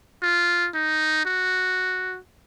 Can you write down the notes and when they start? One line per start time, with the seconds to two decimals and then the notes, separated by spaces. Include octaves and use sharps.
0.22 F4
0.74 D#4
1.25 F#4